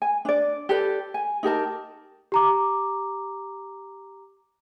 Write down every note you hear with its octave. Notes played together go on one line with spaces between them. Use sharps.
G#5
D4 D5
G4 A4 B4 D5
G#5
D#4 G4 A#4 A5
G4 A#5 D6